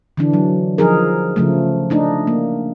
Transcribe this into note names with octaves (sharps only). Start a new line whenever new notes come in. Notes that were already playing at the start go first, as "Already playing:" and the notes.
D3 E3 D4
F#3
F3 D#4 G#4 A#4
C#3 F3 A3
A3 D4 D#4
A#3